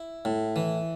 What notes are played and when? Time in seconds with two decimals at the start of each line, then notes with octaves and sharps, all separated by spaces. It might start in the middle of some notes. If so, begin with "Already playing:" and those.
Already playing: E4
0.25 A2
0.56 E3